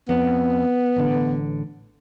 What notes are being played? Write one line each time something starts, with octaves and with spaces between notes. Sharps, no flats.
F2 B3
A1 D3